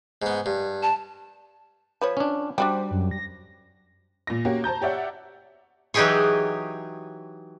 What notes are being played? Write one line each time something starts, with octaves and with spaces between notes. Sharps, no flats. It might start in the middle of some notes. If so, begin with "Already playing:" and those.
G#2 B3
G2
A5
F3 B4 C#5
C#4 D4
G3 D4 F#4 G4 C5
F#2
A#6
A#2 A#6
A#3 C#4 F#4 G4
C5 A5 A#5 G6
G4 C#5 D5 E5 F#5
E3 F#3 D#4 G4 G#4 C#5